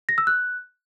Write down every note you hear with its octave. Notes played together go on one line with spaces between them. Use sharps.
A#6
E6
F#6